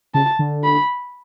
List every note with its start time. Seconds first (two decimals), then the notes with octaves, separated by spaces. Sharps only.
0.14 C#3 A5
0.39 D3
0.64 B5